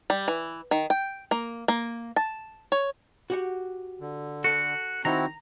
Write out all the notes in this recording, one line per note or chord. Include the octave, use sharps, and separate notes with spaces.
G3
E3
D#3
G5
A#3
A#3
A5
C#5
F#4 G4 F#5
D3
F#4 A4
D#3 C4 D#4 E4 F#4 A#5